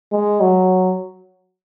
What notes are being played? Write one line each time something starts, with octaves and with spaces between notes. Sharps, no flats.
G#3
F#3